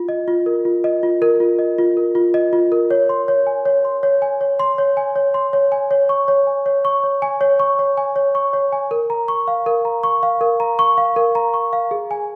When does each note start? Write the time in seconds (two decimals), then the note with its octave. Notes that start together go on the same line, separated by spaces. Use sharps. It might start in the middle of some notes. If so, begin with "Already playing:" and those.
Already playing: F4
0.09 D#5
0.28 F4
0.46 A#4
0.65 F4
0.84 D#5
1.03 F4
1.22 A#4
1.40 F4
1.59 D#5
1.78 F4
1.97 A#4
2.15 F4
2.34 D#5
2.53 F4
2.72 A#4
2.91 C#5
3.09 C6
3.28 C#5
3.47 G#5
3.66 C#5
3.85 C6
4.03 C#5
4.22 G#5
4.41 C#5
4.60 C6
4.78 C#5
4.97 G#5
5.16 C#5
5.34 C6
5.53 C#5
5.72 G#5
5.91 C#5
6.09 C#6
6.28 C#5
6.47 G#5
6.66 C#5
6.85 C#6
7.04 C#5
7.22 G#5
7.41 C#5
7.59 C#6
7.79 C#5
7.97 G#5
8.16 C#5
8.35 C#6
8.53 C#5
8.72 G#5
8.91 A#4
9.10 A#5
9.28 C#6
9.48 F5
9.66 A#4
9.85 A#5
10.03 C#6
10.23 F5
10.41 A#4
10.60 A#5
10.79 C#6
10.98 F5
11.16 A#4
11.35 A#5
11.54 C#6
11.73 F5
11.91 G#4
12.11 G#5